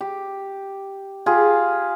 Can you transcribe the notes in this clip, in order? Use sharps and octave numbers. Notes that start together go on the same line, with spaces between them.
G4
F4 G4 G#4